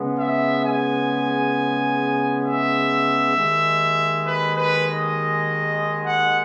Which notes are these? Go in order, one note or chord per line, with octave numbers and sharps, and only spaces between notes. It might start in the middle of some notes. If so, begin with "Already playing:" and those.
Already playing: C#3 G#3 B3
E5
G#5
E5
D#2 D#3 G#3
B4
B4
D#5
F#5